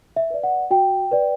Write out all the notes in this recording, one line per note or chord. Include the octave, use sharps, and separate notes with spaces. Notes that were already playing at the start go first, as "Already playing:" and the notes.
E5
B4 D5
F#5
F#4 G5
B4 D5